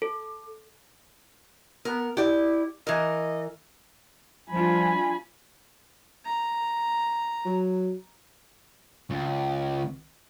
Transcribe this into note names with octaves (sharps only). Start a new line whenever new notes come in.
A4
B3 A#4
E4 G4 D5
E3 A#4 D#5
F3 G3 D4 F4 G#5 B5
A#5
F#3
C#2